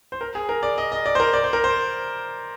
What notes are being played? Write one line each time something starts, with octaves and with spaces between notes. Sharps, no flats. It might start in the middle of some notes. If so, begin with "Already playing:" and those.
C5
A#4
G#4
A#4
D5
D#5
D#5
D5
C5
A#4
D5
C5
A#4
C5